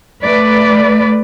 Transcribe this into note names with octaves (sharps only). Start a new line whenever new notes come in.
A3 B4 D5